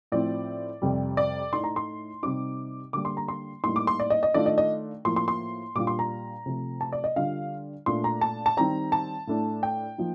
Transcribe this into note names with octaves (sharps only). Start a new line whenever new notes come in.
A2 F3 C4 D5
F2 C3 G3
D5
A2 A3 D#4 C6
A#5
C6
C3 G3 C4 D#4 D6
D3 G3 A#3 D6
C6
A#5
C6
A2 G3 A#3 D#4 C6
D6
C6
D5
D#5
D#5
D#3 A3 D4 F4 D5
D#5
D#5
A2 F3 A#3 C6
C6
C6
A#2 G3 D4 F4 D6
C6
A#5
C3 F3 A3
A5
D5
D#5
D3 G3 D4 F4 F5
A#2 A3 D4 F4 C6
A#5
A5
A5
D#3 G3 C4 A#5
A5
A2 A3 D4
G5
F3 A#3 D#4